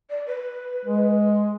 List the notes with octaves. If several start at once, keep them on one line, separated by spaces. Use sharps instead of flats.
D5
B4
G#3